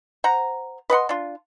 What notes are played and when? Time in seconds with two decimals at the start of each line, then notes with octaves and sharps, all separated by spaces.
0.24 C5 F#5 A#5
0.90 B4 D#5 F#5 C6
1.09 D4 F4